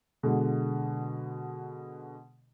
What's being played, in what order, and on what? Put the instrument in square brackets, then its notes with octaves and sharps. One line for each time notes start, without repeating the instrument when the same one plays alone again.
[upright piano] B2 D3 G#3